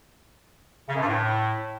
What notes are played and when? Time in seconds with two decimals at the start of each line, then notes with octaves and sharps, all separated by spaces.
0.89 C#3
0.95 F#2
1.01 G2
1.07 A2